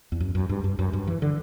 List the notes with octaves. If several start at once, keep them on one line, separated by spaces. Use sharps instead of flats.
E2
F#2
F#2
G2
G2
F#2
G2
E3
D3